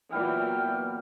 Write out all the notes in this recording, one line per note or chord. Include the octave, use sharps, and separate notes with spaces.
A#2 E3 F#3 G3 A#3 B3 G5 F6